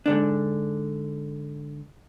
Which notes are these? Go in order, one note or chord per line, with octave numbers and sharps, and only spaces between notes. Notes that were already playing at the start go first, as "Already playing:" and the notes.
G#2 D3 D4